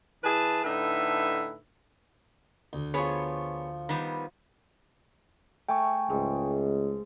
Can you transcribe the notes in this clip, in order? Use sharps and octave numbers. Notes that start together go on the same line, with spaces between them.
E3 E4 G#4 B4 A5
A2 D3 D#4 B4 E5
D2
F3 B3 G#4 C#5 C#6
D#3 G3 B3
A3 G5 G#5 C#6
C#2 G#2